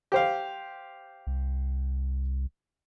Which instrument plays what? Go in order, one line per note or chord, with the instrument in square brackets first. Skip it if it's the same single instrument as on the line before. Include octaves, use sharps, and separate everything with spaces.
[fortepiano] G4 C5 F5
[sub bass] C2